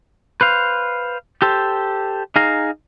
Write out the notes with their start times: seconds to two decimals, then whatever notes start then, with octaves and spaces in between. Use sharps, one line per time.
0.41 B4 C5 F5
1.42 G4 A4 C5
2.36 D#4 G#4 F5 A#5